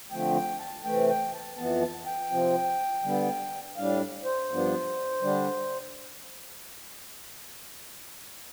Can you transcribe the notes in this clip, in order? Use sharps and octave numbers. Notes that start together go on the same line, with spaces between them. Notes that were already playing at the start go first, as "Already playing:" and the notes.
D3 F3 A3 C4 G5
G5
A5
C3 E3 A3 G5
G5
A5
F2 E3 B3 A5
A5
G5
C3 F3 C4
D3 G3 B3
A2 G3 D4 F5
C5
G2 F3 B3 D4
D3 G3 D4